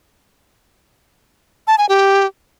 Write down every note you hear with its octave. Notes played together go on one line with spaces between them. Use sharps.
A5
G#5
G4